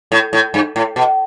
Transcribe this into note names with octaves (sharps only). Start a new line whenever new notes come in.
A2
A2
G2
A2
B2